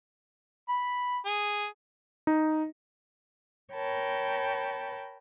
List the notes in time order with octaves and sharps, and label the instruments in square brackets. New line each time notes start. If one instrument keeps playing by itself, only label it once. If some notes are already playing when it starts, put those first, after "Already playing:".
[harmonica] B5
G#4
[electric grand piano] D#4
[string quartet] A#4 C#5 G5 A5 B5